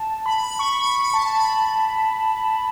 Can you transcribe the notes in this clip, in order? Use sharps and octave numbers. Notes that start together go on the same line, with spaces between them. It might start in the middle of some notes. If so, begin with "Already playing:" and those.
Already playing: A5
B5
B5
B5
C#6
B5
B5
A5
B5